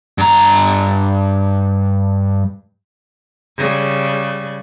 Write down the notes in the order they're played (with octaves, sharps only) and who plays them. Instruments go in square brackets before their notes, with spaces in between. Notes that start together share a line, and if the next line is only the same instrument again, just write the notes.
[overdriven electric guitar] G2 A#5
[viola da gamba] C#3 G3